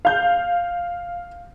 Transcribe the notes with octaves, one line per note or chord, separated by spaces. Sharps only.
F5 G6